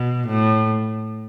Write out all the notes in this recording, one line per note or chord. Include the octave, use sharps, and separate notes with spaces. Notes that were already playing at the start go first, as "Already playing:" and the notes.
Already playing: B2
A2